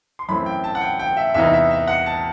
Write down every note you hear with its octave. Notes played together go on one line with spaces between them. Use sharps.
C6
F#2 E3 A3 C4 B5
G5
A5
F#5
G5
G5
E5
E2 C3 E3 B3 D#4 E5
E5
E5
F#5
A5